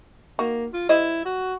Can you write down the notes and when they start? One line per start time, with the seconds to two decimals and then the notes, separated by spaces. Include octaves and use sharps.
0.39 A#3 D#4 F#4
0.74 F4
0.89 G3 E4 C5 D#5
1.25 F#4